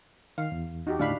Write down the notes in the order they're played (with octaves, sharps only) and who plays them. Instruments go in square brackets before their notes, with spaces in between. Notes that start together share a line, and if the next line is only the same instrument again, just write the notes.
[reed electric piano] D#3 [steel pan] F5
[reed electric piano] E2
[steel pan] D#4 F#4 G4
[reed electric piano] D#2 A2 D3 [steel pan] D4 F5 B5